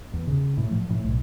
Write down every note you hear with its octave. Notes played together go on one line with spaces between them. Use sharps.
E2
C#3
A2
F3
A2
B1